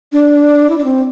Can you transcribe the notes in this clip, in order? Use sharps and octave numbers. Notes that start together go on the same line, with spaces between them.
D4
E4
D4
C4